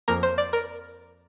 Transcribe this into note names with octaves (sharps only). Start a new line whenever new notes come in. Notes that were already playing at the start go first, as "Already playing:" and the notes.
F2 F3 A#3 A#4
C5
D5
A#4